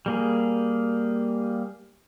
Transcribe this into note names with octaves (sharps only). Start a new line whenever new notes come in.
G3 A#3 G#4